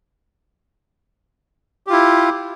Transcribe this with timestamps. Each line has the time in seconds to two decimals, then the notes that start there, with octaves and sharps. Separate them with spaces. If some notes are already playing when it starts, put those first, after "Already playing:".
1.87 G4
1.90 F4
1.93 E4